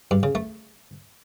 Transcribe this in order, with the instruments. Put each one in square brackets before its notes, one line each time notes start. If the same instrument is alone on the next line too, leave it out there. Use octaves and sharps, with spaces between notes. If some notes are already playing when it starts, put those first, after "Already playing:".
[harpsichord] G2
C#3
A3